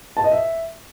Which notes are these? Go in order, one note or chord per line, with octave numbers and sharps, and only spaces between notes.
A5
D#5
E5